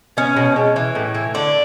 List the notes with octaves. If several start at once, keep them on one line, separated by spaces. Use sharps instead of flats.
B3 C#4
B2
G#3
E3
A2
E3
D3 D4